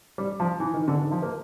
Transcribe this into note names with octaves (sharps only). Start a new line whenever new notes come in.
G3
F3
E3
D#3
D3
D#3
F3
A#3